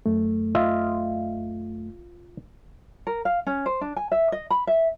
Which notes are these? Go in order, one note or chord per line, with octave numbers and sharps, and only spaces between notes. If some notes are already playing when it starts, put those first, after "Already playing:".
F#2 A3
F4 D#5 E5
A#4
F5
C#4
C5
D4
G#5
E5
D#5
B5
E5